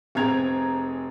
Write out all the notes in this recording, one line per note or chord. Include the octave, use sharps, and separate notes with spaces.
F1 C4 G#4 A#5 G#6 F7